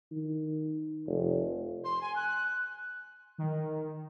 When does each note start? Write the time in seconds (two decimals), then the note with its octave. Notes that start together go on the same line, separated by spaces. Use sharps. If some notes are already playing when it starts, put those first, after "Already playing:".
0.12 D#3
1.07 F1
1.84 C6
2.01 G#5
2.16 F#6
3.38 D#3